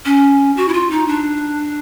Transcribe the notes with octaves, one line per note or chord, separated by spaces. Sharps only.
C#4
F#4
E4
F4
D#4
D4